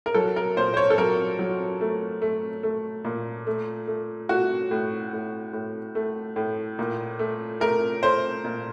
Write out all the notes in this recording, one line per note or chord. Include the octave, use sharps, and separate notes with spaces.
A#4
F#3 A4
A#4
A#2 C5
C5
C#5
A4
F#3 A#4
F#3
A3
A3
A3
A#2
A3
A3
A3 F#4
A2
A2
A2
A3
A2
A#2
A3
A3 A#4
A3 C5
A#2